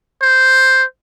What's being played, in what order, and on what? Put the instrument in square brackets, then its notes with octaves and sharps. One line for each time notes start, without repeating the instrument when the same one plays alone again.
[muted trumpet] C5